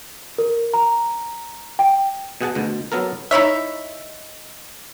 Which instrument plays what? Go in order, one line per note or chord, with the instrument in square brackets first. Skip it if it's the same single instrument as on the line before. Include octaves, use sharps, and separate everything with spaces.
[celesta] A#4
A#5
G5
[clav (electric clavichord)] B2 G#4 F#5 A5
D2 B2
F#3 B3 A4 A#4
[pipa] D#4 E4 C#5 E5